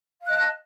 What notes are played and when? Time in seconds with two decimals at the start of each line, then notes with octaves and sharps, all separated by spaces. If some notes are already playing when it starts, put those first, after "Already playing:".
0.22 F5
0.25 F#6
0.29 D#5
0.32 A5